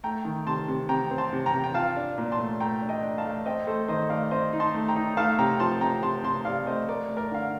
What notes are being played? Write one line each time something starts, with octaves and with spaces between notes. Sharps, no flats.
A3 G5 A#5
D#3
C3 A5 C6
C3
C3 G5 A#5
C4
A5 C6
C3
G5 A#5
C3
G5
F4 F5 A5
D4
A#2
A5 C6
A3
A3 G5 A#5
D4
D#5 G5
D4
F5 A5
A3
C4 D#5 G5
A3 A4 C5
D#3 C5 D#5
A3 D5 F5
C4 C5 D#5
D#4
A5 C6
A3
G5 A#5
D#4
A3 F5 A5
C3 G5 A#5
F3 A5 C6
C3 G5 A#5
C3 A5 C6
C3 A5 C6
C3 D5 F5
A3 C5 D#5
A3 A#4 D5
A3
A#4 D5
D3 F5